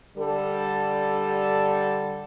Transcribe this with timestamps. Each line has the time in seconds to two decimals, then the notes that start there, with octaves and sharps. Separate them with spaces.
0.17 D3 G3 A4